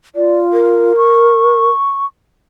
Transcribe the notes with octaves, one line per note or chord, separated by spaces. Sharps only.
F4 D5
A#4
C#6